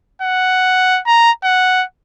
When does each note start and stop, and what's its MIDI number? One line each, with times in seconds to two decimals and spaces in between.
0.22 1.00 78
1.07 1.31 82
1.44 1.84 78